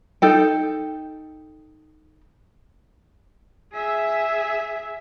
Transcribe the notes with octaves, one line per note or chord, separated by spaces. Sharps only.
D#4 A4 G5
G#4 E5